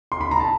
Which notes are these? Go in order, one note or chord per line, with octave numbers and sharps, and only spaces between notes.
C6
B5
A#5
A5